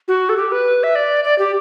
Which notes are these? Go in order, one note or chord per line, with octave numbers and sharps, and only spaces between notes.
F#4
A4
G4
B4
E5
D5
D5
G4